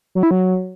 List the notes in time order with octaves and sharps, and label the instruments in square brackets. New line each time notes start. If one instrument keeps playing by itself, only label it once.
[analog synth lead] F#3
E4
F#3